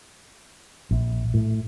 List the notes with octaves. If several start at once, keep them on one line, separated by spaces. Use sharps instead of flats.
A#1
A2